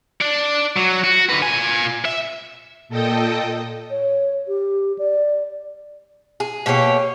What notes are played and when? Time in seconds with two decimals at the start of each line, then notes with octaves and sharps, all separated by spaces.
0.21 D4 D5
0.76 F#3
1.04 F#4
1.30 D3 B4
1.42 A#2 G#5
2.05 E5
2.89 A#2 A4 D#5 G5 D#6
3.91 C#5
4.48 G4
4.99 D5
6.40 G#4
6.66 B2 A#3 G4 C#5